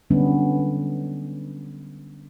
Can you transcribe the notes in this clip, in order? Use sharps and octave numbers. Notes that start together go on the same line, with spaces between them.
D3 F#3 G3 B3 C#4 D4